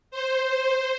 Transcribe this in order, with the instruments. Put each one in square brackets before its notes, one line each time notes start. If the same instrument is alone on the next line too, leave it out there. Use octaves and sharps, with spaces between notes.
[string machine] C5